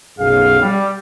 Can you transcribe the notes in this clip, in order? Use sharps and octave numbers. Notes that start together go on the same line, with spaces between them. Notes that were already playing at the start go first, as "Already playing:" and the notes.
B1 F#2 G#4 F5
G3